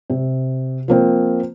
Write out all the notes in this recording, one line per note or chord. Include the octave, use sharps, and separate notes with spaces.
C3
F3 A#3 C4